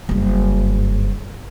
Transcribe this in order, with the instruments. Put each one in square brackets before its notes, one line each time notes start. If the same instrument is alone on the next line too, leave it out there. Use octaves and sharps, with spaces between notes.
[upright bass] F#1 G2